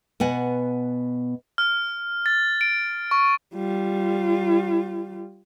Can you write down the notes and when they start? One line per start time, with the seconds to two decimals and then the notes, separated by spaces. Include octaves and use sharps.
0.20 B2 B3 F#5 G#5
1.58 F6
2.26 A6
2.61 D7
3.11 C#6
3.55 G3 F4